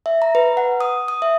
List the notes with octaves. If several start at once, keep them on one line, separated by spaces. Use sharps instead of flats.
E5
A#5
B4
F#5
D#6
D#6
E5